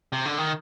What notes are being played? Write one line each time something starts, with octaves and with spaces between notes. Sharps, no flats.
C3
D3
D#3